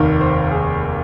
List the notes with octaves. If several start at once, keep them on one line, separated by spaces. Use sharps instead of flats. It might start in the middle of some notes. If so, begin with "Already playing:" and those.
Already playing: F1 D#2 D#3 A#4
C5
G#4